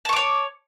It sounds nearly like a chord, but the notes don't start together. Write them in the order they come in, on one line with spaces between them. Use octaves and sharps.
A5 C#6 D6 C#5